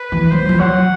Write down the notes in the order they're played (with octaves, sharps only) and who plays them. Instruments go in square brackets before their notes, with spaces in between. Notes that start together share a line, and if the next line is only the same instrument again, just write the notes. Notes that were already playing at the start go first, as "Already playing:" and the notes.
Already playing: [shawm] B4
[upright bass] E3
[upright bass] F#3 [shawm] C5
[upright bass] F3
[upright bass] F#3 [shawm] F#5